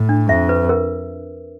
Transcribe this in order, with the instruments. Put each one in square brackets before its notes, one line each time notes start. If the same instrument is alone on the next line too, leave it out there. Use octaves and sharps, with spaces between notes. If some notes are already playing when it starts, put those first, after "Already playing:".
Already playing: [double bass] A2
[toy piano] D4
[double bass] F2 [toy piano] E5
[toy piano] B4
A#4